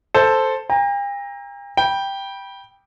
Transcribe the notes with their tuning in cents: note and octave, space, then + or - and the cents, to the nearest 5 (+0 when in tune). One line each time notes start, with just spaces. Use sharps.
A4 +0 C5 +0
G5 +45 A#5 +5
G5 +0 B5 -25